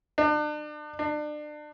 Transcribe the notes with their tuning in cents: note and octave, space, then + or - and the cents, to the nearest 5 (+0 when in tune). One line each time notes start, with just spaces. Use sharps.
D4 +40
D4 +35